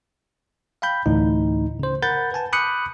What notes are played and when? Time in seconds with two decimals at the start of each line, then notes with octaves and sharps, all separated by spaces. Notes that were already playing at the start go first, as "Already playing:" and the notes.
0.82 F5 G5 B5 G6
1.06 D2 A2 E3 D#4
1.79 C#3 C5
2.02 A#4 F#5 B5 G6 A6
2.32 B4 F#5 G#5 A5
2.53 B5 D6 D#6 F#6 G6 C#7